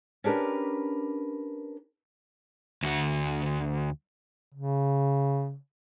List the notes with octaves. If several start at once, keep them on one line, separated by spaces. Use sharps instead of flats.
C#4 D4 G4 A#4 B4
D2 F#4
C#3